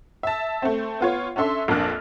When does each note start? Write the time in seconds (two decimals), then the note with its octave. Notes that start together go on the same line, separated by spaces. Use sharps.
0.23 E5 A5
0.62 A3 C4
1.01 B3 F4 C#5
1.36 C#4 D4 A4 E5 C6
1.68 A#1 F2 A#3 D4 F6 F#6